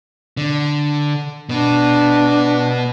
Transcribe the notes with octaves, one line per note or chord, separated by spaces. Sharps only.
D3
B2 B3 D4